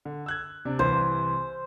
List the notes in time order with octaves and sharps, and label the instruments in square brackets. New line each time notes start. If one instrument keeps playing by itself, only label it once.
[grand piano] D3
E6 F#6 G#6
C3 D4
[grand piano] C2 E3 [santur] C5